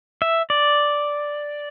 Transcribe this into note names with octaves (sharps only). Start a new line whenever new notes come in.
E5
D5